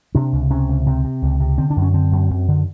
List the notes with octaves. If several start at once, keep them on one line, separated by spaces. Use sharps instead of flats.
C3 D4
C#2
C3 C#4
C#2
C3 C4
C3
C#2
C3
D3 C4
D4
F#2
C#4
D3 C4
F#2
F#2
D3